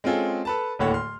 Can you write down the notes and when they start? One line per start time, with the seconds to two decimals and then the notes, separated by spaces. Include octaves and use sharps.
0.04 G#3 C4 C#4 F4 G#4 A4
0.45 A4 B4 A5
0.79 D1 D#2 A2 A4 C#5 F#5
0.94 C6 F6